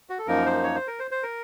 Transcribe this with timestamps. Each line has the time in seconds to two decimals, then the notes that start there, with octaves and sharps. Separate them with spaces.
0.10 F#4
0.19 A4
0.27 F#2 F3 A#3 D#4 A#4
0.46 C5
0.63 C#5
0.75 C5
0.87 A#4
0.99 C5
1.11 C5
1.23 A#4